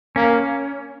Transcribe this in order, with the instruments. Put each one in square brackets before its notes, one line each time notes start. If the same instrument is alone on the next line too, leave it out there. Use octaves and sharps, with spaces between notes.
[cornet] A#3 [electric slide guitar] C#4